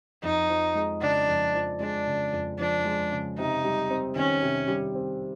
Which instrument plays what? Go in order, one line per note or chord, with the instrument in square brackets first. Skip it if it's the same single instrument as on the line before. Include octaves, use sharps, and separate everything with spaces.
[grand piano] F2 [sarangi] D#4
[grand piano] F3
G#3
[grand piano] C#3 [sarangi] D4
[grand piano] F2
F3
[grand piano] G#3 [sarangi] D4
[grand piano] C#3
F2
[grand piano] F3 [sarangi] D4
[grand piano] G#3
C#3
[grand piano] C3 [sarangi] D#4
[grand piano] G3
C4
[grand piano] D#3 [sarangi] C#4
[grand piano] C3
G3
C4